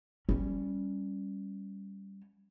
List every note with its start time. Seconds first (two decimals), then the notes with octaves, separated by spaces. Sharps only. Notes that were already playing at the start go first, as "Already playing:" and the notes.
0.29 G3 C#4